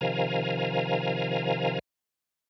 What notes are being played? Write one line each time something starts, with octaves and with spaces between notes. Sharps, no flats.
C3 D#3 F3 F5 G#5 A#5